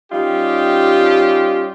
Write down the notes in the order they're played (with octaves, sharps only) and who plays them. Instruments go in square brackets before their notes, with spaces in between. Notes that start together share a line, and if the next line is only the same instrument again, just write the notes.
[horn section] G3 C#4 D#4 F4 G4